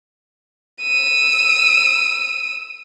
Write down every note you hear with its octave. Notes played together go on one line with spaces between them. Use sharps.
E6 D#7